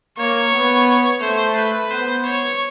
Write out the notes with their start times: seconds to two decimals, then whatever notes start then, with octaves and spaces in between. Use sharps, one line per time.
0.18 A#3 C#5
0.53 B3
1.21 A3 C5
1.56 B4
1.91 B3 C5
2.25 C#5